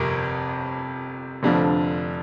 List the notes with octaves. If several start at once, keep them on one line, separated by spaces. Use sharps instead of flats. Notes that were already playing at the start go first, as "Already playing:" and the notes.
Already playing: G1 F2 C3 A#4
F1 F2 D3 F3